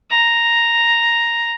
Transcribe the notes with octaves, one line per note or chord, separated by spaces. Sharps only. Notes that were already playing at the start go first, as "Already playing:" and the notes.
A#5